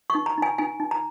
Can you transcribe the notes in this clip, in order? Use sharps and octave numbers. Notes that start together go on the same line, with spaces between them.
C#6
D#4
A#5
D#4 G#5
D#4 G#5
D#4
A#5